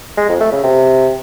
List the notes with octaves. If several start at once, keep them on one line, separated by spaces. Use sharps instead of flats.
G#3
F2
A3
C#3
C3